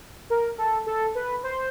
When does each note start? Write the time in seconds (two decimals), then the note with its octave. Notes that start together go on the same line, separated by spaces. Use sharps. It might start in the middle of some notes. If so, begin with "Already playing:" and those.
0.30 A#4
0.58 A4
0.86 A4
1.15 B4
1.43 C5